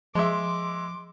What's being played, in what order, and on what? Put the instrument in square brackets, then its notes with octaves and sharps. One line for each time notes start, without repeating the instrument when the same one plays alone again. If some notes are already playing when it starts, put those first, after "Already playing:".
[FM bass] F3 [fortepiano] G#3 E5 [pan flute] C6 [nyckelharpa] D6